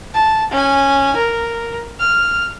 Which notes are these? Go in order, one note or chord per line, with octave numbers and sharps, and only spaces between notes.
A5
C#4 G#5
A#4
F6